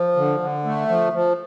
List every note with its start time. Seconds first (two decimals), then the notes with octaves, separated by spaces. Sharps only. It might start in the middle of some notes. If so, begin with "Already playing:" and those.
Already playing: F3
0.16 D3
0.40 D3
0.65 A3
0.89 F3
1.13 F3